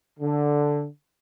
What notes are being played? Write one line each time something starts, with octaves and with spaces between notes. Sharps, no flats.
D3